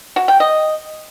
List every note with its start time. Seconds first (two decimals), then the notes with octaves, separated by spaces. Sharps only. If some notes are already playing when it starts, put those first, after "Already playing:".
0.16 F#4
0.28 G5
0.40 D#5